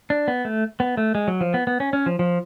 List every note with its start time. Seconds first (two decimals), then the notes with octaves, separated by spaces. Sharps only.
0.10 D4
0.28 B3
0.45 A3
0.80 B3
0.97 A3
1.15 G#3
1.28 F#3
1.41 F3
1.54 B3
1.67 B3
1.80 C#4
1.93 C#4
2.06 F3
2.19 F3